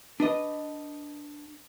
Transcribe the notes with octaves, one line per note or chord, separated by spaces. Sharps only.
D4 B4 D#5